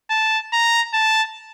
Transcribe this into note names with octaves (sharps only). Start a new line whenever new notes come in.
A5
A#5
A5